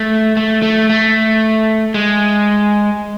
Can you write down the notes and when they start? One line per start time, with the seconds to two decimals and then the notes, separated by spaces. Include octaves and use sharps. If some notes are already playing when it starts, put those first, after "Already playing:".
Already playing: A3
0.37 A3
0.62 A3
0.89 A3
1.94 G#3